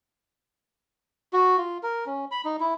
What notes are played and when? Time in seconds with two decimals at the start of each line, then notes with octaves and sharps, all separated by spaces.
1.33 F#4
1.58 F4
1.83 A#4
2.06 C#4
2.31 B5
2.45 D#4
2.60 E4